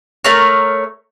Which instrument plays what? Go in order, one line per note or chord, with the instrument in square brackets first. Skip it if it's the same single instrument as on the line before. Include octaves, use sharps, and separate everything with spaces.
[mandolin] A3 A#4 C#5